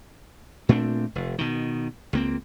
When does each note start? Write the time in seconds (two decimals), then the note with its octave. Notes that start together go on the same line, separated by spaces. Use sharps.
0.69 A#2 A3 C4 D4
1.15 F1
1.38 B2 D#3
2.13 C#2 A#3 C4